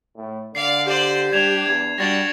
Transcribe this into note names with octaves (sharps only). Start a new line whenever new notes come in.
A2
D3 D5 F5 C7
G4 C5 D5
G3 D4 G#6 E7 F7
E2 G#6
G3 D4 F#4 A6 A#6